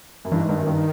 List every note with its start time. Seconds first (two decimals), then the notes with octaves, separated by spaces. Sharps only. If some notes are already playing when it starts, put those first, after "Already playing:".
0.25 F#2
0.32 G2 E3
0.40 G#2
0.49 G2 D#3
0.58 F#2
0.66 G2